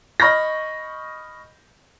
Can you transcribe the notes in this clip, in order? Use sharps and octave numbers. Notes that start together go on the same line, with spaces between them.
D#5 B5 C#6 F6 G6 A#6